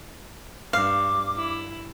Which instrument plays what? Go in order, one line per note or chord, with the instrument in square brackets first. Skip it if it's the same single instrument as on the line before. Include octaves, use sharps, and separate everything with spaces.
[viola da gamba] G2 [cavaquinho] F5 [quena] D6
[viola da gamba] E4